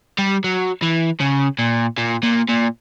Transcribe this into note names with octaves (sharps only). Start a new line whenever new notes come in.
G3
F#3
E3
C#3
A#2
A#2
A#2
A#2